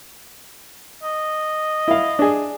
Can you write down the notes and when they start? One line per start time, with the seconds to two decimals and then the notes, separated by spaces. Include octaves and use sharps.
1.03 D#5
1.88 E4 F5
2.19 D4 G#4